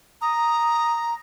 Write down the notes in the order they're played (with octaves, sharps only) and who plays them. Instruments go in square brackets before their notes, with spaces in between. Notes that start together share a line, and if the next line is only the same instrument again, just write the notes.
[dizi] A#5 [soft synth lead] D#6